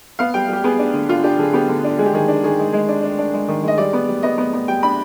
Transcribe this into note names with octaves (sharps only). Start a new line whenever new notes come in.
B3 F5
G3 G5
G3 G4
B3 G#4
D4
D3
D3 F4
D4 G4
D3 G#4
B3 G4
D3
D4
G#3 G#4
G4
D#3 G#4
D4
D#3 G#4
G#3
G#3
D4
D4
D4
G#3
D#3
G#3 D#5
G3 D5
B3
G3
B3 D#5
B3
B3
G3 G5
D4 B5